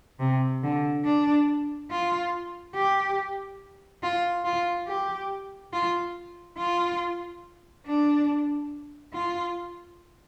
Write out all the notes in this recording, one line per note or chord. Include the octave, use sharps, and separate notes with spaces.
C3
D3
D4
F4
G4
F4
F4
G4
F4
F4
D4
F4